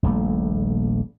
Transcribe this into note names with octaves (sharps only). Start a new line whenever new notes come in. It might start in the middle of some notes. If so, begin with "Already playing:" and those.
D#1 A#1 G3 A3